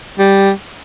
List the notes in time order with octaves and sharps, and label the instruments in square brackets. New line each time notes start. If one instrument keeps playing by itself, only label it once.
[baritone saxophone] G3